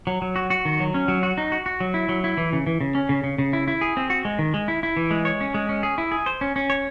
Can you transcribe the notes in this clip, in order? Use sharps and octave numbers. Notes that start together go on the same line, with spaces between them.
F#3
F#3
F#4
F#4
D#3
F#3
C#4
F#3
F#4
D#4
F#4
F#4
F#3
E4
F#3
E4
E3
C#3
E3
C#3
C#4
C#3
C#3
C#3
E4
E4
G#4
C4
F#4
G#3
D#3
G#3
E4
E4
E3
G#3
C#5
C#4
G#3
C#4
G#4
E4
G#4
C5
C#4
C#4
C#5